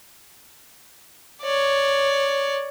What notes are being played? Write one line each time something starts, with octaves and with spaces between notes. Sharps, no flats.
C#5 D5